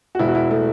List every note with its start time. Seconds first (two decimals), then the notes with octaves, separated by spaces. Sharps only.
0.15 F#4
0.19 E1 E4
0.28 F#4
0.35 E4
0.51 A3